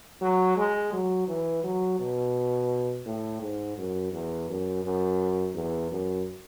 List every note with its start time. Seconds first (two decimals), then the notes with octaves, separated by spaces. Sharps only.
0.22 F#3
0.57 G#3
0.93 F#3
1.28 E3
1.64 F#3
1.99 B2
3.06 A2
3.41 G#2
3.78 F#2
4.13 E2
4.49 F#2
4.84 F#2
5.54 E2
5.91 F#2